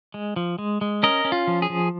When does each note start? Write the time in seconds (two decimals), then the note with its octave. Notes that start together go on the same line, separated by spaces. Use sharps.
0.14 G#3
0.36 F3
0.58 G#3
0.81 G#3
1.03 C#4 A#4 D#5
1.25 C#4
1.32 F4
1.47 F3
1.62 G#4
1.70 F3